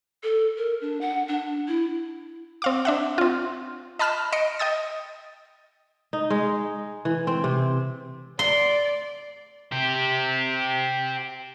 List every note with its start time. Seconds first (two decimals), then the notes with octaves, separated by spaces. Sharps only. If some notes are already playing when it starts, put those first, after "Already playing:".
0.23 A4
0.57 A#4
0.81 D4
1.01 F#5
1.28 D4
1.68 E4
2.62 C4 F5 D6
2.85 D4 E5 F#5
3.18 C4 F4
3.99 D#5 A5 B5 F6 F#6 E7
4.32 D#5 C6 A#6 C#7 D7
4.59 D#5 G5 D#6 A6
6.13 D#4
6.30 G#3
7.05 E3
7.27 C4
7.44 C3
8.39 D5 C6
9.72 G4 C5